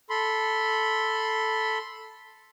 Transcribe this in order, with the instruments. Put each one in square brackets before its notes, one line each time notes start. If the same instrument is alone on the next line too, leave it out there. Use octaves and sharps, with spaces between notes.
[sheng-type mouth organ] A4 B5 C6